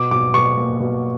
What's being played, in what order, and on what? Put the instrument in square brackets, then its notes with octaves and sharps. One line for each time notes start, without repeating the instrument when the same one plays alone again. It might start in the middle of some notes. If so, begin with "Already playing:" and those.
Already playing: [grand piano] B2 D6
B2 D6
B2 C#6
A#3
B2